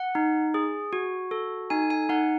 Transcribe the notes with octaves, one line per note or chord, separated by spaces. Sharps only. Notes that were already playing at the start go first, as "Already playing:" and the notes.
Already playing: F#5
D#4
G#4
F#4
A4
D#4 G#5
G#5
D#4 F#5